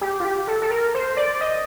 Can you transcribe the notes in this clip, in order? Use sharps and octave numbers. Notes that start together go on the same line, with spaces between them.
G4
F4
G4
A4
A4
A#4
C5
D5
D#5